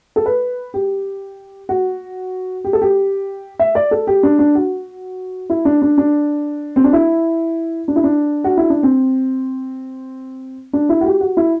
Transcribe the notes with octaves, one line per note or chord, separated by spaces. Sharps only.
A4
B4
G4
F#4
G4
A4
G4
E5
D5
A4
G4
D4
D4
F#4
E4
D4
D4
D4
C4
D4
E4
D4
E4
D4
F#4
E4
D4
C4
D4
E4
F#4
G4
F#4
E4